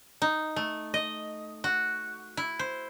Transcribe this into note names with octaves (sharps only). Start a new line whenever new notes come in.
D#4
A3
D#5
F#4
E4
C5